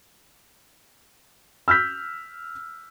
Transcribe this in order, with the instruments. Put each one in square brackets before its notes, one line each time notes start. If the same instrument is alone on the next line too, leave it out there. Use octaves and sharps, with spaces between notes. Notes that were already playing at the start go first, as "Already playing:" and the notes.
[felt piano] E6 F6 G6 B6